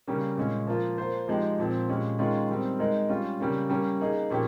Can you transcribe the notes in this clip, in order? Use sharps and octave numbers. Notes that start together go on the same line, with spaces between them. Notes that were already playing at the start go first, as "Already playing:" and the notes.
C#3 G3 A#3 C#4
A#2 G#3 C#4
F3 A#3 F4
A#3 F4 C5
F3 G#3 D#4 G4
A#2 F3 C4
A#2 G#3 C#4 G4
D#3 G#3 C#4 F4 G#4
D#3 G3 C4
G#3 D#4 A#4
G3 C#4 F4
C#3 G3 A#3 C#4
G3 A#3 C#4
A#3 D#4 G#4
A#2 F3 A#3 C#4 G4